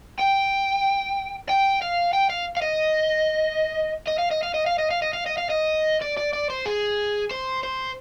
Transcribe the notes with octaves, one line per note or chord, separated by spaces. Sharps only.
G5
G5
F5
G5
F5
F5
D#5
D#5
F5
D#5
F5
D#5
F5
D#5
F5
D#5
F5
D#5
F5
D#5
D5
D5
D5
C5
G#4
C5
C5